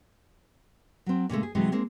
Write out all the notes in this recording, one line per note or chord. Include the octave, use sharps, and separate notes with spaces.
F#3 C4
A#2 C#3 G#3 A3
G#4
C3 E3 F#3 G#3
G#3 A#3 C4 D#4